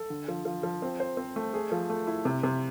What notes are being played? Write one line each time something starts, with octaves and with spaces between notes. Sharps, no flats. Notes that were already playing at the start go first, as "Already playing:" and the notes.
Already playing: A4
D3
F3
F3
F3
C4
C5
C4
A3
G#4
F3
A3
E4
C3
C3